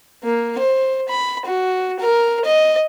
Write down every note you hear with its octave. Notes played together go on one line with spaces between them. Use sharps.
A#3
C5
B5
F#4
A#4
D#5